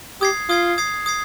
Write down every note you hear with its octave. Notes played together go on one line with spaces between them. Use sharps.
G4 D#6 G#6 C7
F4 D#6 G#6 C7
D#6 G#6 C7
D#6 G#6 C7